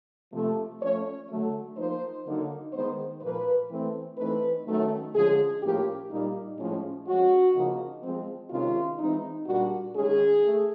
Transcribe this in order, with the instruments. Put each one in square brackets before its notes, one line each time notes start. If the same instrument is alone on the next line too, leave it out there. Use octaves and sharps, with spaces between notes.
[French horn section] C3 F3 A3
F3 A3 C#4 C#5
D3 F#3 A3
F3 A#3 D#4 C5
D3 F#3 A#3 D#4
D#3 G#3 B3 D#4 C5
A#2 F3 A#3 B4
E3 A3 C4
E3 A3 C4 D#4 B4
D#3 F#3 A3 C#4
D3 F3 G#3 C#4 G#4
A2 F3 A#3 C#4 G4
A#2 G3 A#3 D#4
A2 F3 G#3 C#4
F3 G#3 C#4 F#4
C#3 F3 A#3 D#4
F3 G#3 C4
C3 D#3 G#3 C#4 F4
E3 G#3 C4 D#4
A#2 G3 A#3 D4 F#4
D#3 G#3 C#4 G#4
A3